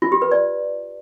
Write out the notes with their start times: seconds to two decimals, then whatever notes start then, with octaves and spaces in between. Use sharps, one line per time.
0.02 F4
0.12 G4
0.22 B4
0.32 D5